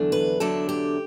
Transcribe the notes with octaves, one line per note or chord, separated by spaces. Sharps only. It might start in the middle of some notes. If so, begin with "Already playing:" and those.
Already playing: E2 D3 F#3 A3 D4
B4
E2 D3 F#3 A3 D4 A4
G4